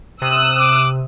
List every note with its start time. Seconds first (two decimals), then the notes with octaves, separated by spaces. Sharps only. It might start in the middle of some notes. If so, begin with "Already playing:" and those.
0.22 C3 D#6 E6 F#6
0.59 D6